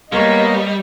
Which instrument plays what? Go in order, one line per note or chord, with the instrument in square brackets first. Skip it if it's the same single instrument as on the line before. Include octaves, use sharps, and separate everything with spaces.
[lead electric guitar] G3 [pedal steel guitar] G#3 B3 C#5 [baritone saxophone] A#3 [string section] D#5